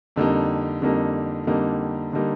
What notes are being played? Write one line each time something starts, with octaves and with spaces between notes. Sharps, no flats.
F2 D3 G3 A#3 D#4
F2 D3 G3 A#3 D#4
F2 D3 G3 A#3 D#4
D3 G3 A#3 D#4